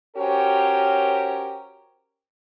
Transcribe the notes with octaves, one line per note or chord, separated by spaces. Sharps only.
C#4 F#4 G4 A#4 C5 C#5